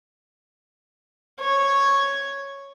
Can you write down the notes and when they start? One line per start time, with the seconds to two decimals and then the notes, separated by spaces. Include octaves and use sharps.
1.39 C#5